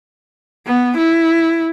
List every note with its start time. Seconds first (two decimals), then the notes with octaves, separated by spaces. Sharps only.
0.67 B3
0.97 E4